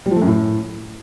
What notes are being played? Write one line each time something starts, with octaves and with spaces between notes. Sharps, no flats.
G3
F3
A3
F#2
A2